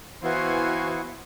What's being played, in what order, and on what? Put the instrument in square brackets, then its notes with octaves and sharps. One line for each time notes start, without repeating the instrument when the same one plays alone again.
[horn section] E3 [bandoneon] B3 E4 [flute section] F#4 F5 C#6 [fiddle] C5 G#5